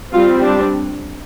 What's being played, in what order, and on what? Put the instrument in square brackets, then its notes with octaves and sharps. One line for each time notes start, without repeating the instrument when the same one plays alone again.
[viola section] G3 C4 F4
D4